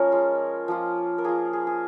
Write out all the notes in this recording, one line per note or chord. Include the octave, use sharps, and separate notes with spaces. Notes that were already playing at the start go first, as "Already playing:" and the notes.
Already playing: F3 A#3 C#4 A#4 C#5 D#5
G#3 F4
F3 A#3 F4
A#4
A#3 F4 G#4
G#4
G#4